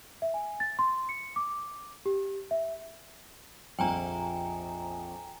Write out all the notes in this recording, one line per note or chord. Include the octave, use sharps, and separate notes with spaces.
E5
G#5
A6
C6
C#7
D6
G4
E5
A#1 F2 G5 G#5 A#5